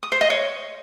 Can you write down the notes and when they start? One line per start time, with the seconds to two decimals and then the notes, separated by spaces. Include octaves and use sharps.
0.03 D#6
0.12 C5
0.21 D#5
0.30 C#5